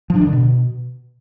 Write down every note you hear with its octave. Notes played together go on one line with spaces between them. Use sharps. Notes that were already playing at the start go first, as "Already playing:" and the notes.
F3
D4
D#3
D3
B2